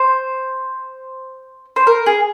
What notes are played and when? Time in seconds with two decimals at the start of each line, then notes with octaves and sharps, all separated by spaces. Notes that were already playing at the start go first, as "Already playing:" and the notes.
Already playing: C5
1.76 C5
1.87 A#4
2.06 G#4